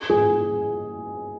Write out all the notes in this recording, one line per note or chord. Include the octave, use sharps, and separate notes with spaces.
G#4